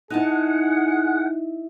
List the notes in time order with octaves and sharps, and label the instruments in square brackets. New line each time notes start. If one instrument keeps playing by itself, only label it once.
[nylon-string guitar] D#4 E4 A5 [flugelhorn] G#4 [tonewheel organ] F#5